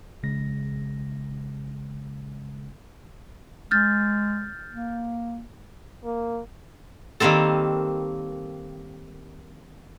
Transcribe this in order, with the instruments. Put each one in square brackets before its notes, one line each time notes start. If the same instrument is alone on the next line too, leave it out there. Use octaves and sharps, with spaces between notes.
[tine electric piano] A#1 C#3 G#3 A#6
[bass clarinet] G#3 [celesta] F6 G6 A6
[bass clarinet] A#3
[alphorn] A#3
[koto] D#3 G3 A#3 C4 A4